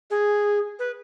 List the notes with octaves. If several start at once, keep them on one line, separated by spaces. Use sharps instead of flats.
G#4
B4